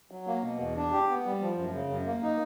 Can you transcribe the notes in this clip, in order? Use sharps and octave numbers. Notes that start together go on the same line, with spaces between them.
F#3
A#3
B2
E2
D4
G4
B3
G3
F3
F#2
C#3
F#2
A#3
D#4